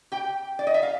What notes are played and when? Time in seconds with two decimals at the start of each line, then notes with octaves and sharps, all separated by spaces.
0.12 G4 G5
0.59 D5
0.67 D#5
0.74 E5
0.83 F5